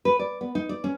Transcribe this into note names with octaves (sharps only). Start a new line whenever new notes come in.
B4
D5
B3
D#4
D5
C#4